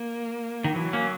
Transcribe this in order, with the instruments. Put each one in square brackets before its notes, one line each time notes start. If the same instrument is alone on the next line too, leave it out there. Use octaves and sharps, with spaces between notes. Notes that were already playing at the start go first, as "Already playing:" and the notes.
Already playing: [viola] A#3
[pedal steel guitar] D#3
[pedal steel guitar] E3 [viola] F#3
[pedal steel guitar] A#3 C#4